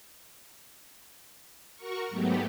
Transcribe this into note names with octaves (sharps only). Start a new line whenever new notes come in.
F#4 A#4 C#6
G#2 F#3 A3 B3 G4